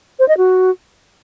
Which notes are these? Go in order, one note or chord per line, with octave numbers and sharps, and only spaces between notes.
C5
D#5
F#4